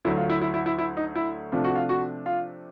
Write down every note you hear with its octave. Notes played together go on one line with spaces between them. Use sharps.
D2 D3 F#3 A3 E4
F4
E4
E4
E4
E4
E4
D#4
E4
C3 F3 A3 D4 F4
F#4
F4
F#4
F4